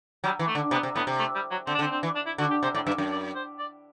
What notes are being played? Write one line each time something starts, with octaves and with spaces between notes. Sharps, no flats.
F#3 G3
E3
A3
D3
C3 B3
C3
A2 B3
C3
A3
G3
F#3
D3 C4
D4
D3 C4
C4
E3
D4
E4
D3 F#4
G4
C3 C5
A2 D5
G2 E5
F#2
D5
C5
D5